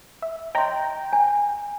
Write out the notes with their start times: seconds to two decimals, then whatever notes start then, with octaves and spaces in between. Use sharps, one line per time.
0.22 E5
0.55 D#5 G5 A#5 C6
1.13 G#5